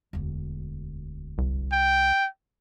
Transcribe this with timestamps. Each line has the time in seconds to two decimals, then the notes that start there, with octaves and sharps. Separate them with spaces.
0.13 E1 D2
1.38 C2
1.72 G5